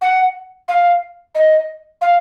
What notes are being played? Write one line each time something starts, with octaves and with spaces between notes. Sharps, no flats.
F#5
F5
D#5
F5